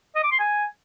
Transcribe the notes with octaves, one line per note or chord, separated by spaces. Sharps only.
D#5
D6
C6
G#5